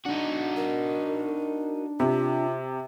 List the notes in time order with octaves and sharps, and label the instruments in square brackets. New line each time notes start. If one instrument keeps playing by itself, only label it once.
[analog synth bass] D4 [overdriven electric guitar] D#4 F#4
[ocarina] A#4
[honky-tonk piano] C3 [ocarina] F4